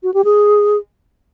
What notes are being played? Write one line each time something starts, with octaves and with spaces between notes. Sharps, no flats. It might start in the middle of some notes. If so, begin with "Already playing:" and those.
F#4
G4
G#4